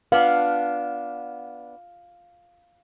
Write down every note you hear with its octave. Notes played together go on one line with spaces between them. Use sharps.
B3 D4 F5